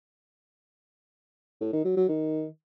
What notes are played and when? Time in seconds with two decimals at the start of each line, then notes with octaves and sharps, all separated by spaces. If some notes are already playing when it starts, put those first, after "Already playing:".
1.61 A2
1.73 D#3
1.85 F#3
1.97 F#3
2.09 D#3